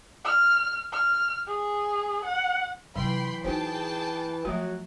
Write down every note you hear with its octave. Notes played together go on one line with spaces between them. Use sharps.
F6
F6
G#4
F#5
C3 E3 F#3 F4 G5 B5 C6
A#3 D#4 F#4 G#4 C5 G5 A5
F3 F#3 A3 F4 F#4